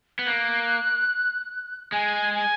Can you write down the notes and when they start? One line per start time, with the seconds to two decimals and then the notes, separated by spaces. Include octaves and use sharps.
0.19 B3
0.27 A#3 F#6
1.92 G#3 G#5
2.34 G#5